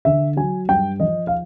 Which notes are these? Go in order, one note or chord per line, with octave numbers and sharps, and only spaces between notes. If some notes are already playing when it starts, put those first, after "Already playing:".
D3 E5
F#3 G#5
G2 G5
F3 D#5
F5